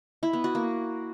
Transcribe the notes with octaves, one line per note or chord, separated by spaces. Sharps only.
E4
B3
F#4
A#3